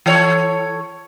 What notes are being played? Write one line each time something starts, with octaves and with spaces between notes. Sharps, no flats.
E3 A4 C#5